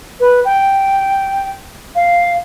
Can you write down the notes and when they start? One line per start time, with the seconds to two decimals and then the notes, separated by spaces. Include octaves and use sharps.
0.20 B4
0.45 G5
1.95 F5